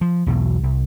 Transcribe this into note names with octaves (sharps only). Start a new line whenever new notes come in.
F3
B1 E2 B2
C2